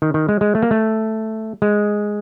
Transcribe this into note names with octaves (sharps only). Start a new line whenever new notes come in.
D#3
D#3
G#3
G#3
A3
A#3
A3
G#3